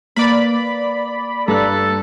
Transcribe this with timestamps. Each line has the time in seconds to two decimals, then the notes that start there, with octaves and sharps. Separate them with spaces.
0.16 A#3 B4 D5 B5
1.48 G2 A4 A#5 F#6